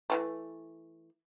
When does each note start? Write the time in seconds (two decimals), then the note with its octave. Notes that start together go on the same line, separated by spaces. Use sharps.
0.10 E3 F3 A3